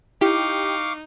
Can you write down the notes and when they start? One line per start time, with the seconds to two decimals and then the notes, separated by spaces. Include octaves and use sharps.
0.21 D#4 E4 G4 F5 C#6 D6